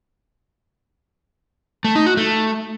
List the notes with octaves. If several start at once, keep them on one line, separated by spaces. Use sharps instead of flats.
A3
D#4
F#4
A3